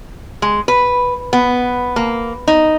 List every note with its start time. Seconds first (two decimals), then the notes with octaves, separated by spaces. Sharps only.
0.42 G#3
0.68 B4
1.33 B3
1.96 A#3
2.48 D#4